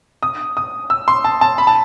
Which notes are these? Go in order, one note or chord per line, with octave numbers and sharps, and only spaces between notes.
D#6
D#6
E6
C6
A5
A5
B5
A5